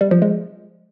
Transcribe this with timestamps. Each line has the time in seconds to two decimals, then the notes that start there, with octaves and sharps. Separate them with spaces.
0.01 G3
0.11 F3
0.22 G#3